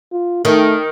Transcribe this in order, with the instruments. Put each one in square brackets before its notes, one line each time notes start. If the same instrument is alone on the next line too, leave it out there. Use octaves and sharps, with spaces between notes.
[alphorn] F4
[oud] D#3 [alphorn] A3